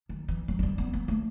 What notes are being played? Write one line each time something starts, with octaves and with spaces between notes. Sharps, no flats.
D#3
E3
F#3
F#3
G3
B3
A#3
A3